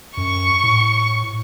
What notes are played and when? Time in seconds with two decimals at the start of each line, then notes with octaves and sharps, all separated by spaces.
0.17 F#2 C#6
0.64 A2